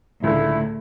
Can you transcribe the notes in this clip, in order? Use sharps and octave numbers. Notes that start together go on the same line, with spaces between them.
C#2 A2 D3 E4